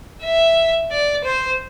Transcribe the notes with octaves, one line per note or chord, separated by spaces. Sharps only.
E5
D5
C5